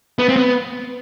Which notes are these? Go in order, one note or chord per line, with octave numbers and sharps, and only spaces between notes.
B3
C4
B3